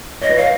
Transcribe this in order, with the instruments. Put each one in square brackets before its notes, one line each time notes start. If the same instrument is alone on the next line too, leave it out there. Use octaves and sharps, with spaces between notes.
[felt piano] C#5 [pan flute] D#5
[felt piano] B4
[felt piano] C#5 [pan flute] F5